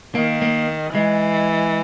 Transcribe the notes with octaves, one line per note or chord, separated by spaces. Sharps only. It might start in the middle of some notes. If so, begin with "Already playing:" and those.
D#3 A#3
A#3
E3 G#3